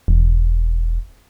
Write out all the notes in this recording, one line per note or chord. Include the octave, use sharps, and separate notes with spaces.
E1